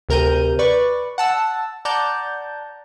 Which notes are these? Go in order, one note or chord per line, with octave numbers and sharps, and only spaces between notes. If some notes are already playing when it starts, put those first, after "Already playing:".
D2 C3 A#4 A#5 G6 D#7
B4 D5 C#6
F#5 A5 E6
D5 F#5 A5 A#5 G6